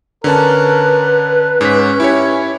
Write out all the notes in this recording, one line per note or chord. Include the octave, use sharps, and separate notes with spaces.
D3 C#4 A#4 B4 A5
G#2 C#4 B6
E4 G4 C#5